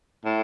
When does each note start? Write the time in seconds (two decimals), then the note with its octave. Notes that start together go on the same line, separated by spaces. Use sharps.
0.25 A2